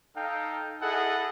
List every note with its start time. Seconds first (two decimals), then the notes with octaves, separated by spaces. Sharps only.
0.15 D#4 A4 F5 G5
0.82 E4 G#4 A4 D#5 F#5